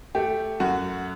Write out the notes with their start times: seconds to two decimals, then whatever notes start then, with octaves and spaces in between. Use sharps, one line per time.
0.15 A3 G4
0.60 F#2 F#4